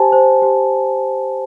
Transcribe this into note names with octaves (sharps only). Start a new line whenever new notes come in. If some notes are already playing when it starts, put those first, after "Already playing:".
Already playing: G4 C5 G#5 A5
C5
G4